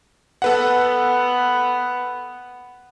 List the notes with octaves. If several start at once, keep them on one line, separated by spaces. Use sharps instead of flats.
B3 A4 B4 F#5